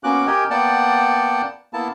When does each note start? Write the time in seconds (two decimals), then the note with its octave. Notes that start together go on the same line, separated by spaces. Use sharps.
0.04 A#3 B3 C#4 F#4 D6 F#6
0.27 G4 A#4 D#5 G5 G#5
0.50 A#3 B3 D5 F#5 G5 A5
1.74 A#3 B3 E4 A5